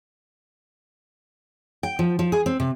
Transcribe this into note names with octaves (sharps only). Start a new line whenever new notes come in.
G5
F3
F3
G#4
C4
C3